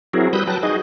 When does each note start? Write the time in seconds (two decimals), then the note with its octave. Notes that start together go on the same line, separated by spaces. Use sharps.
0.13 F#3 C4 E4 F#4 G#4 A#4
0.33 G3 B4 D#6 E6 F#6 G6
0.47 F#3 B4 G5 A5 F#6 A#6
0.63 D#4 F#4 G#4 D#5